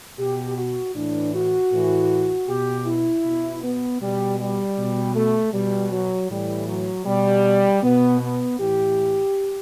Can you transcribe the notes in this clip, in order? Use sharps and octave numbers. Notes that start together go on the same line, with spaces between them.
B2 G4
F#4
A2 E3 D4
F#4
A2 E3
B2 G4
E4
B2
B3
B2 G3
G3
B2
A3
B2 G3
F#3
A2 E3 G3
F#3
B2 G3
B2 B3
B3
A2 E3 G4